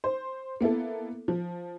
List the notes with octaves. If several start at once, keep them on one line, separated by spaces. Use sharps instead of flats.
C5
A#3 B3 E4 A4
F3